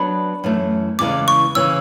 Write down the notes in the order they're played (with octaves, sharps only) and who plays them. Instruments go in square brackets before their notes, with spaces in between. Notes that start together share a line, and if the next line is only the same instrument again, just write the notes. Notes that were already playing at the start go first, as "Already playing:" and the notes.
Already playing: [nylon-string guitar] F#3 B3 D4 [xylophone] B5
[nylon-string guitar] F#2 E3 A3
[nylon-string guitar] E2 C#3 E3 G#3 [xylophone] D6
[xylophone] C#6
[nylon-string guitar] C#3 E3 G#3 C#4 [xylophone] E6